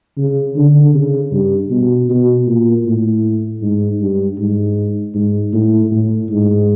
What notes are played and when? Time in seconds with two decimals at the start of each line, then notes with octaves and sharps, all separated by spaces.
0.18 C#3
0.56 D3
0.95 C#3
1.32 G2
1.71 B2
2.09 B2
2.47 A#2
2.86 A2
3.62 G#2
4.00 G2
4.38 G#2
5.15 G#2
5.54 A2
5.92 A2
6.30 G#2